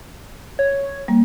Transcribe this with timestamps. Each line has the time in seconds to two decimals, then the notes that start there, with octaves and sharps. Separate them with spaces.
0.59 C#5 G#6
1.08 G3 A#3